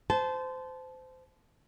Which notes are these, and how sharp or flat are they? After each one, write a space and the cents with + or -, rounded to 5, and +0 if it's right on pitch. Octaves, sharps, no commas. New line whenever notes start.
C5 -25 A5 -20